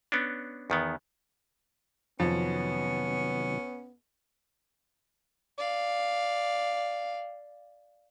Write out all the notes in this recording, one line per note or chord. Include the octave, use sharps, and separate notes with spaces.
B3 C#4 D4
E2 D#3 B3
F2 C3 D#3 F#3 B3 C#4
D5 F5